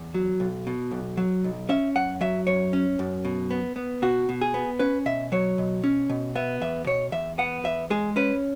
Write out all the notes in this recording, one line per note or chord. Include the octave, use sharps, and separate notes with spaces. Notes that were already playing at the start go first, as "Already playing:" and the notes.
Already playing: E2
F#3
B1
B2
B1
F#3
B1
C#4 E5
F#2 F#5
F#3 E5
F#2 C#5
C#4
F#2
B2
B3
B3
B2 F#4
B2
G#4
B3
C#4 B4
B2 E5
F#3 C#5
B2
C#4
B2
B3 E5
E2 E5
B2 C#5
E2 E5
B3 F#5
E2 E5
G#3 G#4
C#4 B4